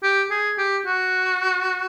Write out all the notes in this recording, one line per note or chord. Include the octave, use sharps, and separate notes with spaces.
G4
G#4
G4
F#4